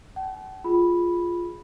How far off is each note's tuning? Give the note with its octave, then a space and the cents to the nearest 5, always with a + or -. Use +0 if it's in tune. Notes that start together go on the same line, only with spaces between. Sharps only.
F#5 +45 A5 -45
F4 +0 G#4 +0 B5 -5